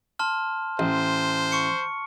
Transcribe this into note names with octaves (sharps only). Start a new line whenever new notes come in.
A5 C6 F6
A1 C5
C#6 C#7